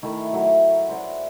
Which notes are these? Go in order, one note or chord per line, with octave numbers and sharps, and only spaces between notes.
D#3 A3 E4
F#3 E5 F#5 A#5
G#4 C5 D5 F#5